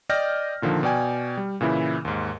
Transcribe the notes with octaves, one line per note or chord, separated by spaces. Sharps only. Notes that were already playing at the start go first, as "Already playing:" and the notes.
D5 D#5 G5 F6 G6 A#6
A#2 D3 D#3 F3
B2 D5 G5 G#5
G3
A#2 C#3 E3 E4
D#2 G#2